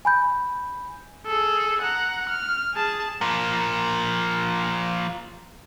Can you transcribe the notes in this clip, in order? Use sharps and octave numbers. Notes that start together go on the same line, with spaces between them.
G#5 B5 G6
G#4 A4
F#5 A#5
F6
G#4 A5
F3 A#3